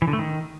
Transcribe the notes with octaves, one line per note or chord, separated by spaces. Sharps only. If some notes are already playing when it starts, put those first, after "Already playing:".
E3
D3
A3
D#3